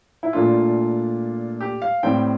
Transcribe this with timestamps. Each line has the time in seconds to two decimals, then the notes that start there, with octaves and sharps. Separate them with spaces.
0.23 E4
0.33 A#2 A3 D4 F4
1.61 G4
1.82 F5
2.03 A2 G3 C4 G5